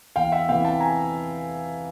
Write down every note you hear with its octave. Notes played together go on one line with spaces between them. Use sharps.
E2 F5 G5
E5 F#5
C3 E3 F5 G5
G5 A5
G#5 A#5